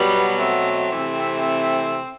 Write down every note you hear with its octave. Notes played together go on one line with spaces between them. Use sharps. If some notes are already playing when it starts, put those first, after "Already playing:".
Already playing: B2 F#3 G3 B3
A3 C4
E3
C3